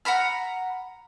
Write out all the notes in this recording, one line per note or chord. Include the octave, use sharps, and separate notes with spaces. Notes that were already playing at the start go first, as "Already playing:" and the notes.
F#5 A#5 B5 F6